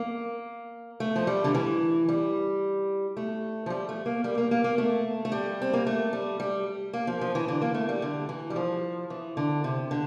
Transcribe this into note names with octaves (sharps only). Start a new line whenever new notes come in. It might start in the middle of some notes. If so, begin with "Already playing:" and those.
Already playing: A#3
A3
F3
G3
D3
E3
G3
A3
F3
G3
A3
A#3
G3
A#3
A#3
A#3
A3
A3
G3
C4
A#3
A3
G3
G3
A#3
F3
F3
E3
D3
A#3
A3
G3
D3
E3
G3
F3
E3
D3
C3
D3